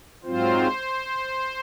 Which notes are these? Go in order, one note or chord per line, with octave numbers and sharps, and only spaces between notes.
G#2 F#3 C4 F4 C5